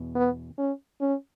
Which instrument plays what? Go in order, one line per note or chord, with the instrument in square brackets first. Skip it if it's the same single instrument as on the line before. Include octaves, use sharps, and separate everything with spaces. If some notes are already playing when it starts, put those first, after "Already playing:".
Already playing: [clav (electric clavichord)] E2 B2
[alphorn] B3
C#4
C#4